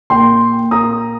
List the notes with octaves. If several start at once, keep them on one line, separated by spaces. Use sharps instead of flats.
A#2 A#3 G5 C6
A#2 A#3 A#5 D#6